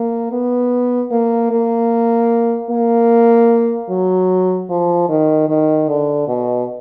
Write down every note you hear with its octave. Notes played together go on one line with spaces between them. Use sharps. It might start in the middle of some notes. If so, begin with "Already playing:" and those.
Already playing: A#3
B3
A#3
A#3
A#3
F#3
F3
D#3
D#3
D3
B2